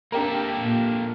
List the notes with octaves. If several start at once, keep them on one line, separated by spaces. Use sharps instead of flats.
A#3 D4 G4 A4 A#4
A#2